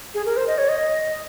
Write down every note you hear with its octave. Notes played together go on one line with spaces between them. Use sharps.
G#4
A#4
C5
D#5
C#5
D#5